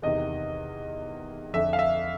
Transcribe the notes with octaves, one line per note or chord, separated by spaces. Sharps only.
E2 C3 D#3 D#5
F2 D3 E5
F5
E5